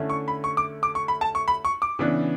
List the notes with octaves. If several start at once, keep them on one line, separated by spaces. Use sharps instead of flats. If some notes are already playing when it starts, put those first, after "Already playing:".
Already playing: D3 A3 C#4 E4
C#6
B5
C#6
D6
D6
C#6
B5
A5
C#6
B5
C#6
D6
C#3 E3 B3 D4